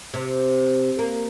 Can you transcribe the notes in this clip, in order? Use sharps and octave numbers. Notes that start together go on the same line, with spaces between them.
C3
A#3